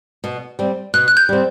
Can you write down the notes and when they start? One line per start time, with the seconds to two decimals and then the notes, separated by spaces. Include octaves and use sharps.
0.24 B2
0.59 G3 C4
0.94 B2 F#6
1.08 F#6
1.17 G6
1.29 G3 C4